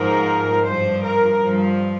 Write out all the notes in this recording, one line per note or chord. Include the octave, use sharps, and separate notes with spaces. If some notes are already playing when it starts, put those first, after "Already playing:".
Already playing: G#2 F3 A#4
G2 F3 C5
A#4
G2 F3